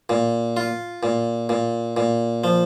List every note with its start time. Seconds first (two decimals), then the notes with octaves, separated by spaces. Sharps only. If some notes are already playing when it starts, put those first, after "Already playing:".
0.09 A#2
0.57 F4
1.03 A#2
1.49 A#2
1.97 A#2
2.44 F3